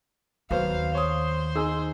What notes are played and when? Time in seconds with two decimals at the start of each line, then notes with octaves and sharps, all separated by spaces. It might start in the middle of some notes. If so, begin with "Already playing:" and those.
0.51 D#2 F#3 B3 C5 F5
0.95 C5 C#5 D#6
1.55 D#4 G#4 E6